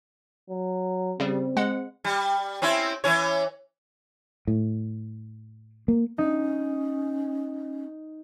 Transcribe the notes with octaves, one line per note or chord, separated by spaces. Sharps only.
F#3
C#3 G3 C4
G#3 F#5
G3
C4 C#4 E4
E3 C#4 C#5
A2
A#3
C#4 D#4